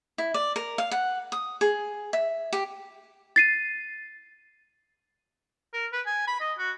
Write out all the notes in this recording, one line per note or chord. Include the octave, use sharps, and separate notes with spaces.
E4
D5
A#4
F5
F#5
D#6
G#4
E5
G4
A6 C7 D#7
A#4
B4
G#5
B5
D#5
F#4